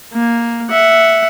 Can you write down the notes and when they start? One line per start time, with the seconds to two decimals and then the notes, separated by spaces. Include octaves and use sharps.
0.14 A#3
0.71 E5 F#5